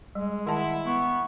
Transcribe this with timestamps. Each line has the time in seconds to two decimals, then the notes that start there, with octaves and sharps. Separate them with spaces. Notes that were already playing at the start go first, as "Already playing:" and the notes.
0.15 G3 G#3
0.46 D#3 E4 F#5 A5
0.86 B3 C#6